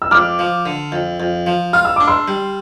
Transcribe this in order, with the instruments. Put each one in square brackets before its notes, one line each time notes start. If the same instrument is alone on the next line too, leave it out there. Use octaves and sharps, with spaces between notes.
[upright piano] E6
[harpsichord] F2 [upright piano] D6 F6
[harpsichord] F3
D3
F2
F2
F3
[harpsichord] F4 [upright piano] F6
[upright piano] E6
[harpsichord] D4 [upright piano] D6
[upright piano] C6 E6
[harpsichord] G3